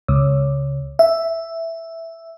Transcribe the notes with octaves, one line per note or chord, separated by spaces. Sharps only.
C#2
E5